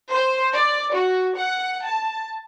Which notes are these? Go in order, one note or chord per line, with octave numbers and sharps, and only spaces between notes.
C5
D5
F#4
F#5
A5